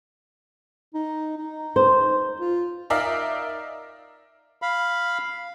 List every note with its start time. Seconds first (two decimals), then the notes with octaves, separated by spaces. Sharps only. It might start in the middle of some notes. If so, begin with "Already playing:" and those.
0.94 D#4
1.37 D#4
1.76 C5
2.40 F4
2.90 D#4 A#4 D5 E5 F5
4.62 F5 B5